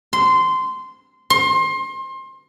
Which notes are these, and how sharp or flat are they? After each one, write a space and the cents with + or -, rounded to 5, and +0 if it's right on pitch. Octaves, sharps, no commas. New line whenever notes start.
C6 -15
C6 +30